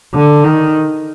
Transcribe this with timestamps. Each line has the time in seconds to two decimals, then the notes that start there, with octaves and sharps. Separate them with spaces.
0.14 D3
0.44 D#3